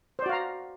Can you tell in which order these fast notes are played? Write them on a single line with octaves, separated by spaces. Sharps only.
C5 D5 F#4 F5 A#5